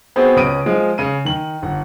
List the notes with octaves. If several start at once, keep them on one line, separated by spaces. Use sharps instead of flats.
B3 C4 F#4 G#4 C5
C#2 C#4 B4 D#6 D7 D#7
F3 G#3
C#3 D#7
D#3 F#7
G1 F#5